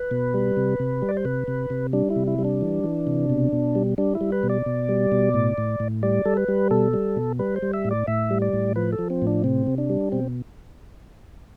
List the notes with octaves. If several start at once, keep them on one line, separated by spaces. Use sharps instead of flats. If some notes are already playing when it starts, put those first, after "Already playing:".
Already playing: B4
B2
G3
C3
C3
G3
D5
C5
C3 B4
C3
C3
G3 D4
E4
C3
E4
G3
D4
E3
E3
C3
B2
B2
G3
G3 D4
E4
G3
B4
B2
D5
B2
G3
B2
A2
A2
A2
G3 D5
G3 A4
B4
G3
B2 A4
G3
B2
G3 B4
C5
G3
E5
A2
D5
A2 E5
G3
D5
A2
F3 B4
A4
F3
C4
A2
D4
C3 C4
C3
D4
G3
B2 C4